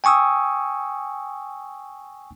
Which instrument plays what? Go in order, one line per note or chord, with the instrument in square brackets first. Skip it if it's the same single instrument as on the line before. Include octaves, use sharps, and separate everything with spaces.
[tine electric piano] G5 G#5 C#6 D#6 E6